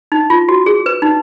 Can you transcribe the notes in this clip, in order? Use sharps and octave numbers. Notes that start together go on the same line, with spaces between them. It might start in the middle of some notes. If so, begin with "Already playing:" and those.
D#4
F4
F#4
G#4
B4
D#4